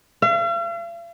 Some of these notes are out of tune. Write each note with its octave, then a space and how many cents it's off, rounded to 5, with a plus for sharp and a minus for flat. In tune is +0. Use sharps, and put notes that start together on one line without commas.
F5 -45